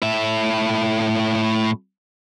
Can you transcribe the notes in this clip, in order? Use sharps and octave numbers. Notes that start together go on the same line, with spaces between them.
A2 E5